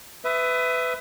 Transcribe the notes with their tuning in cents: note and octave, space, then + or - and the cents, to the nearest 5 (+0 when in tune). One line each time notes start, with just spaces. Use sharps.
B4 +25 E5 +0 D#6 -5